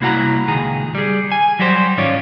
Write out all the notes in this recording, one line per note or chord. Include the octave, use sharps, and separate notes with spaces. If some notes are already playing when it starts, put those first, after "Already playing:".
C2 A#3 E4 F#4 F#5 A#5
C#2 A#2 D#3 G#4 A#5
G3 G#4
G#5
F#3 G3 F#4 G4 C5
G#2 D#3 C#4 F4 C#5 D5